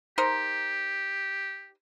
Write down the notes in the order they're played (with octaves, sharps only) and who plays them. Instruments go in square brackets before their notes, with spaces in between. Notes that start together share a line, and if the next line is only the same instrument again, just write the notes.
[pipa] D#4 A#4 C5 [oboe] G4